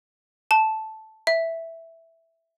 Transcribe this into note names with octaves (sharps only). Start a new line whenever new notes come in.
A5
E5